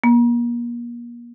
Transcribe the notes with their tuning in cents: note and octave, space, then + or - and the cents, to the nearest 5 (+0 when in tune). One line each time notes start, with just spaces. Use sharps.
A#3 +35